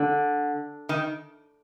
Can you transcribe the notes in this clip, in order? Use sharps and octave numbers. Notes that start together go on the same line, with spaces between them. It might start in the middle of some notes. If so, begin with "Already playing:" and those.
Already playing: D3
D#3